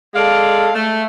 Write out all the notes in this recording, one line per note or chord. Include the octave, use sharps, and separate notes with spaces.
G#3 A4 D5 F5
A3